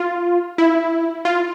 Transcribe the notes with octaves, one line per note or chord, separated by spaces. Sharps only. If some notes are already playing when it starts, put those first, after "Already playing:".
Already playing: F4
E4
F4